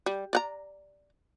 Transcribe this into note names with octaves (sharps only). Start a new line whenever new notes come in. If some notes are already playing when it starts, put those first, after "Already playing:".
G3
D5 F#5 A#5